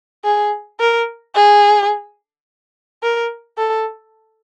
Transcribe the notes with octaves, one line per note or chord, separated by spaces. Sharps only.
G#4
A#4
G#4
A#4
A4